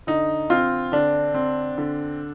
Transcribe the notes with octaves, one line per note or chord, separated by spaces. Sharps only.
D3 D#4
C4 F4
D3 D4
C4
D3